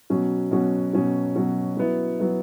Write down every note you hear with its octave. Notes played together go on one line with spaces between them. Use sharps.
B2 F#3 C#4 F#4
B2 F#3 C#4 F#4
B2 F#3 C#4 F#4
B2 F#3 C#4 F#4
F#3 B3 E4
F#3 B3 E4